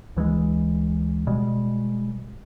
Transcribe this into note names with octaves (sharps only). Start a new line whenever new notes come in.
D2 E3 F#3 G#3
B2 G3 G#3